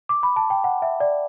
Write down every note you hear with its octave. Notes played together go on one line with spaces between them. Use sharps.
D6
B5
A5
G5
F#5
E5
D5